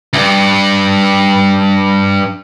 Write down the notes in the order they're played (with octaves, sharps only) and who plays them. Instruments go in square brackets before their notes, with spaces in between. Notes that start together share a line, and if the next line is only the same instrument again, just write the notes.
[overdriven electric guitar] D2 G2